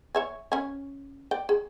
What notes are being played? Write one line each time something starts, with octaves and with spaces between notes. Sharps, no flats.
C#5 E5 G#5
C#4 G#5
D5 G5
G#4